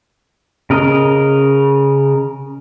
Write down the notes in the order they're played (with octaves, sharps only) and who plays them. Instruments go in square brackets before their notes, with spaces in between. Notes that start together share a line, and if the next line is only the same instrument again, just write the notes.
[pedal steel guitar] C#3 A#4 D#5